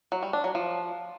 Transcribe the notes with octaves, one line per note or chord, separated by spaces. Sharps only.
F#3
G3
D4
F#3
F3